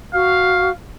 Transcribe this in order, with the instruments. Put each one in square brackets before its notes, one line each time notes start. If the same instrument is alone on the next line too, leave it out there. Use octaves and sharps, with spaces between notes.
[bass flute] F#4 [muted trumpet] F5